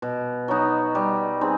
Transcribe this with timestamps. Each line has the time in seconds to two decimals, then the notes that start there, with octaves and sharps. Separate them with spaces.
0.02 B2
0.48 F#3 B3 D#4
0.95 G3
1.41 C4 D#4 G#4